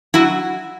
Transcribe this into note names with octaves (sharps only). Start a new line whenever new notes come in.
F#3 E4 F#4